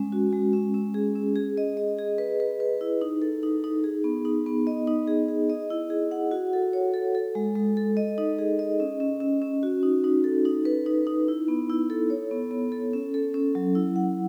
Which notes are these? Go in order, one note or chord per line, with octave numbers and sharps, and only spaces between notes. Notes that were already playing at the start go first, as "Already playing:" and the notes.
Already playing: G#3 C#4
F#4
G#3
C#4
C#4
G#4
C#4
G#4
D#5
D#5
G#4
B4
B4
B4
E4
D#4
A4
D#4
D#4
G#4
B3
D#4
B3
D#5
D#4
G#4
G#4
D#5
E4
G#4
F#5
F#4
A4
C#5
A4
A4
G#3
G#3
A4
D#5
D#4
G#4
D#5
C#4
C#4
C#4
C#4
F#4
D#4
D#4
A4
D#4
B4
D#4
D#4
E4
B3
E4
A4
C#5
B3
B3
A4
C#4
A4
C#4
F#3
E4
F#5